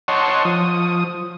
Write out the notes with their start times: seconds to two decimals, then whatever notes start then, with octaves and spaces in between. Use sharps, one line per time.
0.08 C#5 D#5 F#5 A5 C6 C#6
0.45 F3 D#6